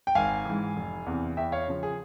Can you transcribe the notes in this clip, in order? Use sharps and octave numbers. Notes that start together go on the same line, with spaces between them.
G5
G#1 F5 G#5
G#2 E3
F1
E2 C3 E3
E2 E5 G5
C#5 F5
C#3 F3
G#4